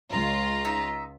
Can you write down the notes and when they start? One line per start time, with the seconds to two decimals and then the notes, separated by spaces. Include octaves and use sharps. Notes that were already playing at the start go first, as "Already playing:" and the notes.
0.11 C#2 F4 A#5
0.65 D#4 E5